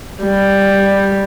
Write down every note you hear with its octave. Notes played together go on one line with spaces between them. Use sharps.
G3